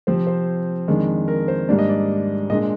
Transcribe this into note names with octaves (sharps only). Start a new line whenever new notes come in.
C3 F3 C4 C5
C5
F2 D#3 G#3 D4
A#4
C5
G#2 G3 A#3 D4 D5
D#5
D5
A#2 G#3 D4 D#5